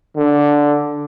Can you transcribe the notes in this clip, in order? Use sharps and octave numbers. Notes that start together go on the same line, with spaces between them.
D3